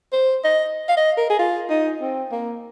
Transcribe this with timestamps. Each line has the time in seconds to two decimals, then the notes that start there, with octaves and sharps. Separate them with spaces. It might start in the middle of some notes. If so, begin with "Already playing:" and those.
0.12 C5
0.44 D#5
0.88 F5
0.97 D#5
1.17 A#4
1.30 G#4
1.39 F4
1.70 D#4
2.01 C4
2.32 A#3